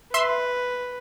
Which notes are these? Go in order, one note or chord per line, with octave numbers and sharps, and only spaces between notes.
B4 E5 C6